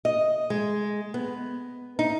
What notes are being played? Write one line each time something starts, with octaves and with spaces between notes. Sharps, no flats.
D#5
G#3
B3
D#4